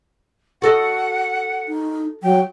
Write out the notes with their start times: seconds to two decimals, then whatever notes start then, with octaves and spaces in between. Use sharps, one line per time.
0.62 F#4 A4 D#5 F#5
1.68 D#4
2.23 F#3 G5